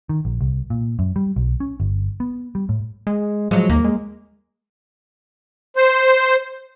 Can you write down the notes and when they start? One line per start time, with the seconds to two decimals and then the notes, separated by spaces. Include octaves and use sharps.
0.09 D#3
0.25 A#1
0.41 C2
0.70 A#2
0.99 F#2
1.16 G3
1.36 B1
1.60 C#4
1.80 G1
2.20 B3
2.55 G3
2.69 A2
3.07 G#3
3.51 F3 F#3 G#3
3.70 D#2 A#3
3.84 G#3
5.76 C5